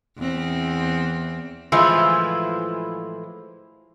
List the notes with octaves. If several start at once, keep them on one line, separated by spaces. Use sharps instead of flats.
E2 C4
A2 E3 F3 G#3 E4 F4